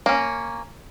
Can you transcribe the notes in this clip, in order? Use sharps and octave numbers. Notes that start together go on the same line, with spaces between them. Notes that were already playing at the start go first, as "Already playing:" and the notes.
A#3 C#4